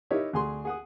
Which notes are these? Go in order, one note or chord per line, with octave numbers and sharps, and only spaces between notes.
D#4 E4 G4 A#4 C#5 E5
D2 G#4 C6
G#4 F#5 D#6